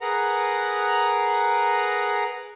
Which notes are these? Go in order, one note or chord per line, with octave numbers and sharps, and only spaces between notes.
G#4 A#4 B4 F#5 A#5